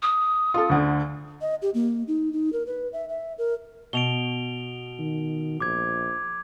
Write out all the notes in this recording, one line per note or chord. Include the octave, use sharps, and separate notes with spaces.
D#6
F4 A4
D2 D3
D#5
G4
A#3
D#4
D#4
A#4
B4
E5
E5
A#4
B2 D7 F7 G7
D#3
A#1 D6 G#6